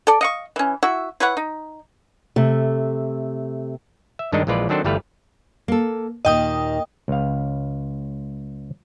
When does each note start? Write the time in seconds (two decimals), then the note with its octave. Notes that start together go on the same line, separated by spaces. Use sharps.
0.07 A4 D5
0.21 D#5 F5 C#6
0.56 E3 C#4
0.83 E4 F#4 E5
1.20 E4 B4 C#5 F#5
1.37 D#4
2.36 C3 A3
4.19 E5
4.32 G2 D#3 G#3 D4 D#4 D#5
4.47 A#1 E3 G#3 F4 B4 D5
4.69 D#3 F#3 C4 D4 A4 C5
4.84 G1 E3 G3 A3 B4 F5
5.68 A#3 A4
6.25 D#2 A#2 D#3 D#5 G5 D#6
7.08 C#2 F5